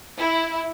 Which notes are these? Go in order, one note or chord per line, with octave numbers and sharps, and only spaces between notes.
E4